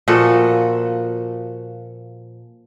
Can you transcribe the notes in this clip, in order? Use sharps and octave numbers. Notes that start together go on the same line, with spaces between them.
A#2 F3 F#4 A4